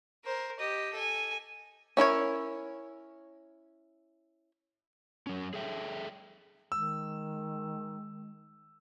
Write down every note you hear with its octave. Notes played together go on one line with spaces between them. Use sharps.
A#4 C5
G4 D#5
A4 G#5
C#4 E4 A#4 C#5
F#3 C#4
G#4 A4 E5 G5
D#3 G#3 E6